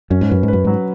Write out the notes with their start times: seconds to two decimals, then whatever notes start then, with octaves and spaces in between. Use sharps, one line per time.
0.10 F#2 C#4
0.21 G#2
0.29 F#2 B4
0.43 G#2
0.48 F#2 B4
0.64 G#2 F#3